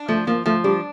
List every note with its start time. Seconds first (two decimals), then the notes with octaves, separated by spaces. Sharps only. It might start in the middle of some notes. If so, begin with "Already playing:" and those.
Already playing: D4
0.08 F3 A3
0.27 F3 A#3
0.46 F3 A3
0.64 G3 D4